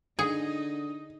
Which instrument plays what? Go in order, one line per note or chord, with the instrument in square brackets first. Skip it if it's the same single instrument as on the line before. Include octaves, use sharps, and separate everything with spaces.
[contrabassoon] D3 [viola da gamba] D#4 [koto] G#4 [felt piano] D#6